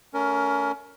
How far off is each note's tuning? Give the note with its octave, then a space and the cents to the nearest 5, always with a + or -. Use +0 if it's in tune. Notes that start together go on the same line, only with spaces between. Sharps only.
A3 +0 C#4 +25 A#4 +0